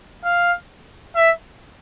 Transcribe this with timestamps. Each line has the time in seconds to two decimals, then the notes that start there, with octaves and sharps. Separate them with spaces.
0.25 F5
1.16 E5